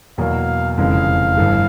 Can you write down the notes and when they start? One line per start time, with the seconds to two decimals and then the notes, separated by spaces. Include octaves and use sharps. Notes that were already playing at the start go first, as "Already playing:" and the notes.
0.18 E2 B2 F#3 A#3 F5
0.77 F1 F2 C#3 E3 G#3 F5
1.36 G1 G2 E3 A3